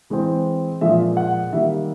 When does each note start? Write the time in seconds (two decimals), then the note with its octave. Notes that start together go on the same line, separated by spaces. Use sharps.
0.10 E3 G#3 C4
0.81 A#2 F3 G#3 E5
1.17 F#5
1.52 D#3 G3 A#3 E5